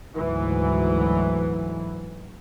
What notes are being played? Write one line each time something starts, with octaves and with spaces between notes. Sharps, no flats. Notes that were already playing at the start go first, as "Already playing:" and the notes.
D2 G#2 E3 F#3